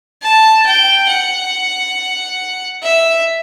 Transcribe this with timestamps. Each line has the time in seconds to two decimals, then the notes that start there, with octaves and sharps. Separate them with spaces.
0.22 A5
0.66 G5
1.09 F#5
2.83 E5